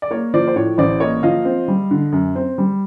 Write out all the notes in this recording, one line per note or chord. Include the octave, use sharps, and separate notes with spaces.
D5
A#3 C#5
F3 C5 D5
C5
A2 C#5
A1 C5 D5
A#3 C#5 D#5
F3 D#5 F5
C4
G3
D3
F#2
C4
G3